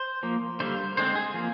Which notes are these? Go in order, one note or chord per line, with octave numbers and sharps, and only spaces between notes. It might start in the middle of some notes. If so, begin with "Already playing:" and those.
Already playing: C5
F3 A#3
D3 G3 A#3 C5
D3 G#3 C4 C5
G#4
F3 A#3